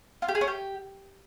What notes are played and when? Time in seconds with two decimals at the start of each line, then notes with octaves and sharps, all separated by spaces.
0.22 F4
0.28 G4
0.35 G#4
0.41 C#4
0.48 G4